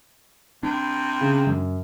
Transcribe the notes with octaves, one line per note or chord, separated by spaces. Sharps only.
C3 D4
C#3
F#2